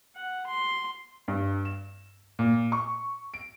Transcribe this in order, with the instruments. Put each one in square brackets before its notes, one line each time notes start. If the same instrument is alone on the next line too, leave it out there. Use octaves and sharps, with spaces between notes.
[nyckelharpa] F#5
C6
[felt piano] G2
E7
A#2
C#6
D7